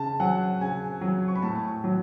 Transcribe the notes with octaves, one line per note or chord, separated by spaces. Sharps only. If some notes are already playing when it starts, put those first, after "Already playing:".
Already playing: C#3 A5
F#3 F#5
C#3 G#5
F#3
C#6
B5
A2 A5
F#3